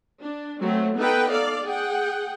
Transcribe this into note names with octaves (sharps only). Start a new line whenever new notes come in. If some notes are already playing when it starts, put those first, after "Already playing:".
D4
F#3 A3 C4
B3 D#4 A4 B4 G5
A4 D5 F5
G#4 F#5 G5